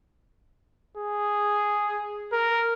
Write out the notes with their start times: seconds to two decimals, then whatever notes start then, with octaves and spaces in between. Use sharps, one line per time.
0.96 G#4
2.32 A#4